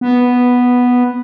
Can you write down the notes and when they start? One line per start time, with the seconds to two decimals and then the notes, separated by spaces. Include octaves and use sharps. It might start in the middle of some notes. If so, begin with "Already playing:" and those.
0.01 B3